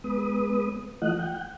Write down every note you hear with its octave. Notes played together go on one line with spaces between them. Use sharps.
G#3 B3 B4 D#6
E3 A3 F4 D#5 F#5 F#6
F#5 G5